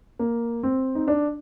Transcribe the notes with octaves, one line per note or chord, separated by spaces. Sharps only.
A#3
C4
D#4
D4